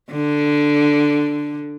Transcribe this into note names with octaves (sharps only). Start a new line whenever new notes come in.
D3